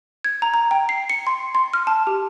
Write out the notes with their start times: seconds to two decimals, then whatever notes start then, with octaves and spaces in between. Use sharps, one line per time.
0.24 G#6
0.42 A#5
0.54 A#5
0.71 G5
0.89 C7
1.10 C#7
1.27 C6
1.55 C6
1.73 F6
1.87 A5
2.07 G4